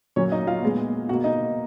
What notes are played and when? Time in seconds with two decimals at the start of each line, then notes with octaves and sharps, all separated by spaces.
0.16 A#2 F#3 A#3 C#4 C#5
0.32 D#4 D#5
0.47 F4 F5
0.62 A#2 G#3 B3
1.09 B2 F#4 F#5
1.13 A#3
1.24 D#4 D#5